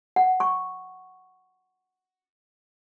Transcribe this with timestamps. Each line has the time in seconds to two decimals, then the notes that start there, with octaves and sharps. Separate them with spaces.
0.16 F#5
0.40 C#6